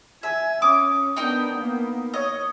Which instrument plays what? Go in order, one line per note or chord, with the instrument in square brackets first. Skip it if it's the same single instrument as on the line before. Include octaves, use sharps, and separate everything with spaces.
[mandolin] E5 [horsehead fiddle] G#5
[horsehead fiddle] C#4 [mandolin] D6 [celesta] D#6
[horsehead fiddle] B3 D4 [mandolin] D#4 A#4 G5
[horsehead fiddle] A#3 B3
[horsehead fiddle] C#5 [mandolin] D#5